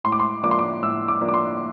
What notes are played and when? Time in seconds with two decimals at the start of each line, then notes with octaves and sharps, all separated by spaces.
0.04 A2 C6
0.12 D6
0.20 C6
0.43 F3 A#3 D4 D6
0.51 C6
0.59 D6
0.82 A2 E6
1.08 D6
1.21 F3 A#3 D4
1.29 D6
1.34 C6